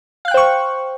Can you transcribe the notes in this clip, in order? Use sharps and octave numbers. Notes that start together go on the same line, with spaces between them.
C5 F5 G5 C#6 F#6